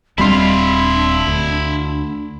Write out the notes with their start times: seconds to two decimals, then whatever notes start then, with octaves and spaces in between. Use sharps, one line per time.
0.18 D#1 G3 C4 D4 E4 F5 B5 C6
1.27 D2